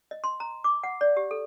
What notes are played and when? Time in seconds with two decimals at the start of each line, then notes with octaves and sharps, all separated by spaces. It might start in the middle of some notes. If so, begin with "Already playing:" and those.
0.11 D#5
0.24 C6
0.40 A#5
0.64 D6
0.83 F#5
1.01 D5
1.17 G4
1.31 A4